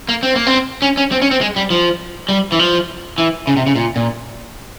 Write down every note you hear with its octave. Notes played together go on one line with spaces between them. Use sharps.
A#3
C4
A#3
C4
C#4
C#4
C4
C#4
C4
G#3
G3
F3
G3
E3
F3
E3
C#3
C3
C#3
A#2
A#2